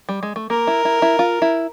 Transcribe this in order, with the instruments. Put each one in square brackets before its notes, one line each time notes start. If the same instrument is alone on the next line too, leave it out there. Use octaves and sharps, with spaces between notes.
[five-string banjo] G3
G#3
A3
[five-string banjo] A#3 [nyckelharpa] A#4
[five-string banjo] E4
E4
E4
F4
E4